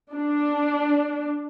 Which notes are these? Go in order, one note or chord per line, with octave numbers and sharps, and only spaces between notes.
D4